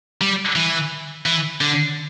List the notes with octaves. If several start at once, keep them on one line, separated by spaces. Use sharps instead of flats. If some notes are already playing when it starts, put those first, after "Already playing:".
G3
E3
E3
D3